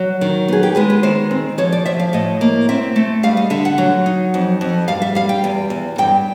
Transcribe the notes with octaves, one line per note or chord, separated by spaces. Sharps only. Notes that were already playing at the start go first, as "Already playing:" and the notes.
Already playing: F#3
D#3
B3 G#4
G4
G#3 B4
B4
D#3 C5
C4
F3 C#5
D5
F3 E5
F5
A2 D#5
A#3
C4 E5
A3
G3 F5
D#5
D3 E5
F#5
F#3
D#4
F2
F2
G2 F5
E5
G3 F5
G5
E2
E2
G2 G5